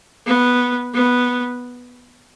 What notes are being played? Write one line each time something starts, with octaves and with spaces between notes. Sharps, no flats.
B3
B3